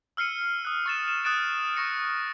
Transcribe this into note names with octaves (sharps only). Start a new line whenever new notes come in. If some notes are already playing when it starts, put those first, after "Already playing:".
E6 F6 C7 C#7 D#7
D#6 F#6
C#6 A6 E7
E7
D#6 F#6 G6 A6 D7 E7
C#6 A#6 C#7 D7 E7